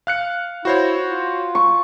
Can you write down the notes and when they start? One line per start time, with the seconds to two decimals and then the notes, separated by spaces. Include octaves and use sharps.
0.07 F5 F#6 C#7
0.65 E4 F#4 C5 C#5
1.08 F4
1.55 C#6